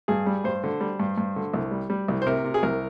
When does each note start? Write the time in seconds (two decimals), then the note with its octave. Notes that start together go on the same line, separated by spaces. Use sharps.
0.08 G2 G#4
0.26 G3
0.44 G2 C5
0.64 D3
0.81 G3
1.00 G2
1.18 G2
1.36 D3
1.54 C2
1.71 G3
1.90 G3
2.08 C2
2.22 C5
2.26 C3 A#4
2.45 C3
2.54 G#4
2.63 C2 A#4